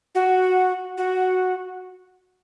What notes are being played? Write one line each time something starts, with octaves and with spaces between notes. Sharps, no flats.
F#4
F#4